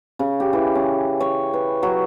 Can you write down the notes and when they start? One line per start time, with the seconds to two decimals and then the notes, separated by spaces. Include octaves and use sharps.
0.19 C#3
0.40 G4
0.53 E3
0.75 C#4
1.20 C#5
1.54 B4
1.83 F#3